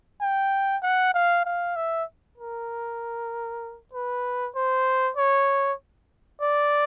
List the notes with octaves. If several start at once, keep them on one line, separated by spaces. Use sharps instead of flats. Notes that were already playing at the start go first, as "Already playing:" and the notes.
G5
F#5
F5
F5
E5
A#4
B4
C5
C#5
D5